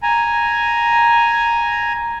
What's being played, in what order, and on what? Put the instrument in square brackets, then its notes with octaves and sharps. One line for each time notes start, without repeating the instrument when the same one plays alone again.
[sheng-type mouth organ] G#5 A#5